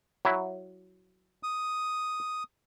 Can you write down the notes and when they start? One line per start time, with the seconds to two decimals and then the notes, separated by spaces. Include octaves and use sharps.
0.25 F#3 E4
1.43 D#6